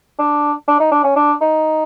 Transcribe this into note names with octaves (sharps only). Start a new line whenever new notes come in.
D4
D4
D#4
D4
C#4
D4
D#4